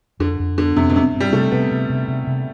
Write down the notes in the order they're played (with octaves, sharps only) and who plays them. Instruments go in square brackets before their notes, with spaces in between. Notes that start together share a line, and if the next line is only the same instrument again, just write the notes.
[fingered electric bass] F2 [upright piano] D3
[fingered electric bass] F2
[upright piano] D3 [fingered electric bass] B3
[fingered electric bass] F2 [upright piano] C3
[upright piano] B2
[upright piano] C3 [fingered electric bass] D4
[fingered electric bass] G2
[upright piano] G3
[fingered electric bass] C3 [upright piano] A3
[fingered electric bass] C3 [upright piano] B3
[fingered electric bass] C3
C3
C3
C3